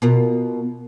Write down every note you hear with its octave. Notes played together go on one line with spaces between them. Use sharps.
B2 F4 A#4